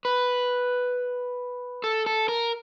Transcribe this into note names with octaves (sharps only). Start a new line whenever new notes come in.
B4
A4
A4
A#4